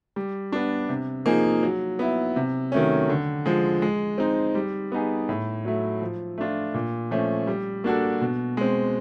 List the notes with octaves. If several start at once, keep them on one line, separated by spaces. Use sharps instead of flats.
G3
B3 D4
C3
F3 A#3 D#4 G#4
F#3
B3 E4
C3
D#3 F#3 A3 C#4
D3
F3 G#3
G#3
C4 D#4
G3
B3 D#4 G#4
A2
F#3 A3
F3
A3 D4 F4
A#2
F3 A3 C#4
G3
A#3 D4 F#4 A4
B2
G#3 C4